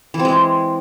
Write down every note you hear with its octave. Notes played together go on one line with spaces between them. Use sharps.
E3
C4
G#3